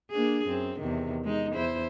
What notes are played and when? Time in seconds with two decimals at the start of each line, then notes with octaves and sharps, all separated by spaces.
0.11 A#3 D4 G#4
0.48 F#2 C4
0.79 E2 C3 D#3
1.24 G#3 D#4
1.55 E2 E4 C5